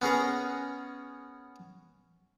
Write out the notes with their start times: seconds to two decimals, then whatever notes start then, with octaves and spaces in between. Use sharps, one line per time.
0.02 B3 C#4 G#4 A#4